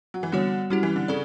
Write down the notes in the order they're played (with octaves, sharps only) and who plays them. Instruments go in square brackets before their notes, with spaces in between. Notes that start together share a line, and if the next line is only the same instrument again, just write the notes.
[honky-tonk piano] F#3
E3
[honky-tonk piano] D3 [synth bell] G3 B3 F#4 C#5
[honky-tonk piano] F#3 [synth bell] G3 C#4 E4 G4
[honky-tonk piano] E3
D3
[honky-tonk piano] C#3 [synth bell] A4 D5